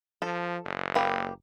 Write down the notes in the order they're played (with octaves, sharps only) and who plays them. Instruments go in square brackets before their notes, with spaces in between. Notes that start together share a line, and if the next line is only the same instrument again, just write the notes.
[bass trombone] F3 [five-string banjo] A4
[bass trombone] F#1
[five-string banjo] A#3 G4 B4